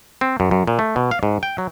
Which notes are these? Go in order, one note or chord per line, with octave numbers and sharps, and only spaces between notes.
C4
F#2
F#2
A#2
A3
B2
F5
G#2
G5
F#3